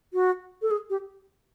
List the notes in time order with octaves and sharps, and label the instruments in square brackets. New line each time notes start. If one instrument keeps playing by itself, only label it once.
[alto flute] F#4
A4
G#4
G4